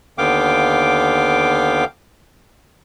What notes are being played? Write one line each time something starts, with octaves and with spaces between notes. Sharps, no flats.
D#2 D3 B3 F5 G5 D6